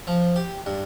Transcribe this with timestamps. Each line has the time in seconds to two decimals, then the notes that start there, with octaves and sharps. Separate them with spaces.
0.07 F3
0.36 G4
0.66 G2